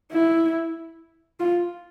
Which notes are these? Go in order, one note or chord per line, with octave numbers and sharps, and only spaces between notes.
E4
F4